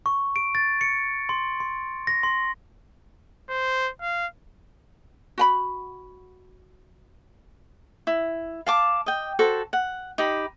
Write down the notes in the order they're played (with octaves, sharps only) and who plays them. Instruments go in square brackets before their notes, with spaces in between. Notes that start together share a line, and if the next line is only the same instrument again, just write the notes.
[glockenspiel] C#6
D7
A6
C#7
C6
C6
A#6
C6
[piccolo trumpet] C5
F5
[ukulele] F#4 G5 B5
[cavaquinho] E4
F5 A5 D6
D#5 G5
F#4 A4 C5
F#5
D#4 G4 B5